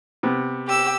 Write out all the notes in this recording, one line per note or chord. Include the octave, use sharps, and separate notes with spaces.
C3 B3
G4 E6